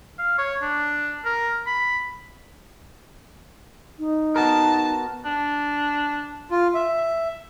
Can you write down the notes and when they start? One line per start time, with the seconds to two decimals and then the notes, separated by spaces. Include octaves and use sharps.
0.19 F5
0.38 C#5
0.62 D4
1.25 A#4
1.67 B5
3.99 D#4
4.36 B3 F#4 A#4 A5
5.25 D4
6.51 F4
6.74 E5